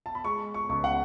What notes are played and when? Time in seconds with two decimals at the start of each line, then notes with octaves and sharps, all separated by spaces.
0.06 A5
0.15 B5
0.24 G#3 C#6
0.54 C#6
0.69 C#2 C#6
0.84 F#5